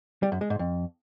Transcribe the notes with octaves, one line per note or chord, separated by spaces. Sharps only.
G3
F#2
G#3
G#2
F2